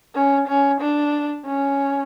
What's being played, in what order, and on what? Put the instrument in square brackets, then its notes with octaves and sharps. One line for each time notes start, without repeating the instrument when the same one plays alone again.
[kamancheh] C#4
C#4
D4
C#4